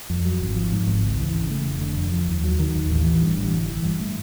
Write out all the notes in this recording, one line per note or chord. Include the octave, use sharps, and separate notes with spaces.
F2
F#3
G#1
F3
G#2
G#1
C#2
E3
C#3
A3
F1
D3
F2
F3
D#2
F#3
D#3
D#2
A1
E3
G2
A1
G1
E3
G2
A3